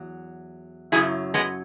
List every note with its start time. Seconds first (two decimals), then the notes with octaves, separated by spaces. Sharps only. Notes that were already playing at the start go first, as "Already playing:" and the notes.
Already playing: E2 F#3
0.92 F#2 C#3 F#3 E4 G#4
1.34 G#3 B3